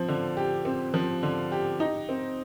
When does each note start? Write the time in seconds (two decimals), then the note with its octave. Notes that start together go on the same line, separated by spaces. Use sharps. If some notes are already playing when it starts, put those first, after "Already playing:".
Already playing: F3 C4
0.08 D3
0.37 G4
0.65 C4
0.94 F3
1.23 D3
1.52 G4
1.80 D#4
2.09 C4